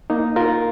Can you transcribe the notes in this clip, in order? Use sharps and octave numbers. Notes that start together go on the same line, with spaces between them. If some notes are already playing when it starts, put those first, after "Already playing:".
A#3 D#4
F4 A#4